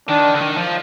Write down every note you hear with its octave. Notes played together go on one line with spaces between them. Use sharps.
D#3 D4
D3
D#3
F3